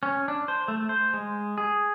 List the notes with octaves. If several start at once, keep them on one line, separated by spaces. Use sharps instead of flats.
C#4
D4
C5
A3
C5
G#3
G#4